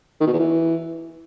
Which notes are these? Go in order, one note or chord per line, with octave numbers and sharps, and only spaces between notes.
D#3
B2
E2
E3